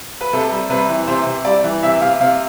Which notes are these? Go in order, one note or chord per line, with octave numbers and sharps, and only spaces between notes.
B4
C3 A4
G3
C3 B4
E3
C3 C5
C3
G3 D5
E3
C3 E5
C3 F5
C3 F5